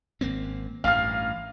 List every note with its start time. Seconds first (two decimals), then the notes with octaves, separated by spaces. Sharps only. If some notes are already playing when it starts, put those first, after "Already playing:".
0.21 G#1 A#3 C4
0.84 A1 G2 F5 F6